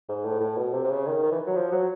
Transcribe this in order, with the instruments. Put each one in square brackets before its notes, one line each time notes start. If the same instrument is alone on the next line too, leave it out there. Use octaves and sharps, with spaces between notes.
[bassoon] G#2
A2
A2
B2
C3
C3
C#3
D#3
D#3
E3
F#3
F3
F#3